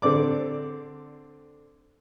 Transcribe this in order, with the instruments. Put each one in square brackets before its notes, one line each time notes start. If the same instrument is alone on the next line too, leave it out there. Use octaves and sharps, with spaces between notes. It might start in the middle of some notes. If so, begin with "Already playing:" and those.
[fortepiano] D3 C4 D5 D6